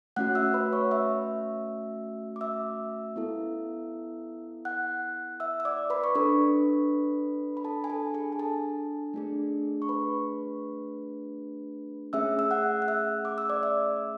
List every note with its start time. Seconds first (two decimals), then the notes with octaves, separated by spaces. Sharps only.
0.16 A3 C#4 F#4 F#5 F#6
0.35 E5 E6
0.54 B4 B5
0.72 C#5 C#6
0.91 E5 E6
2.36 D6
2.41 E5 E6
3.16 B3 E4 A4
4.65 F#5 F#6
5.40 E5 E6
5.60 E6
5.65 D5 D6
5.90 B4 B5
6.04 C#6
6.15 D4 A4 B4 B5
7.57 B5
7.64 A4 A5
7.84 G#5
7.90 A4 A5
8.14 G#4 G#5
8.32 G#5
8.39 A4 A5
9.14 A3 D4 G#4
9.82 C#6
9.89 B4 B5
12.13 A3 C#4 G#4 E5 E6
12.39 E6
12.51 F#5 F#6
12.82 F#6
12.88 E5 E6
13.25 D6
13.38 E6
13.50 D5 D6
13.63 E5 E6